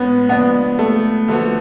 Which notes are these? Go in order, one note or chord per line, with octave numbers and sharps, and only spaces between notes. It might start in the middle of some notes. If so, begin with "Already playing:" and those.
Already playing: A2 G#3 B3 C#4
C#3 F3 G#3 B3 D4
A3
D3 F3 A3 B3 F#4